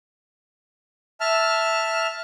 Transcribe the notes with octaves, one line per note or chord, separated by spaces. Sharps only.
E5 A5 F6